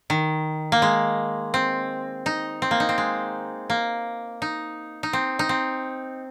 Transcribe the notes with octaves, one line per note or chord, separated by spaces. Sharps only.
D#3
A#3
G#3
C4
D#4
C4
A#3
D#4
C4
G#3
A#3
D#4
D#4
C4
D#4
C4